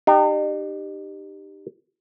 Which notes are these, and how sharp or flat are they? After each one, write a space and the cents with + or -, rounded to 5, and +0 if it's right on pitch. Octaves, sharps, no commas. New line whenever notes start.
D#4 -40 G4 +0